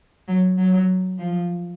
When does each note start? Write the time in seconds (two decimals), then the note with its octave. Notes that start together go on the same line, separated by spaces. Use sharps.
0.28 F#3
0.58 F#3
1.18 F3